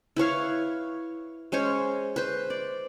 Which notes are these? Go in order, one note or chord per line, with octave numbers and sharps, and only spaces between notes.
E4 B4 C#5 F5
G#3 C#4 C5 C#5
B4 C5
D5